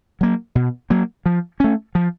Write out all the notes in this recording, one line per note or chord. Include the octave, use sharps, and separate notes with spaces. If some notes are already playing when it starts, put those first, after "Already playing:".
F#3 A#3
B2
F#3 A#3
F3
A3 C#4
F3